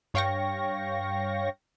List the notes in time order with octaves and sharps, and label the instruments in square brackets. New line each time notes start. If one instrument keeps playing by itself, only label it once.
[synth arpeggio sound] G2 C#5 F5 G5 C#6 A#6